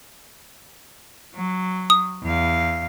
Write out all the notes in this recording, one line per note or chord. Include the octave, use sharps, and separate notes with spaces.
F#3
D#6
E2 F5